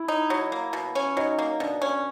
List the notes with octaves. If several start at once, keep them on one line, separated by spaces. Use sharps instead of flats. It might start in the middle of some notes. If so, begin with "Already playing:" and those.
Already playing: E4
D#4
F#3
A#3
B2
C#4
F#3 D#4
A#3
B2 D4
C#4